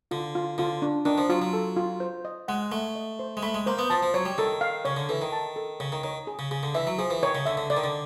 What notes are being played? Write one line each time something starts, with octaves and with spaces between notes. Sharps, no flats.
D3 F4
F4
D3 F4
D4
D#3 D4
F3
F#3 F4
F#3
A4
F4
C5
D#5
G#3 F#5
A3 F#5
D#5
C5
G#3
A3 B5
G#3
A#3 C5
B3
F3 A5
F3
F#3 C#5
G3
D#3 A4
F5
C#3 C#5
D3
E3 A4
D#3
A5
A4
C#3 C#5
D#3
D#3 C#5
G#4
C#3
C#3 G#4
D3
E3 E5
F#3
F3 G#4
E3
D#3 C#5
C#3
D3 E5
D3
D3 D5
D#3
D3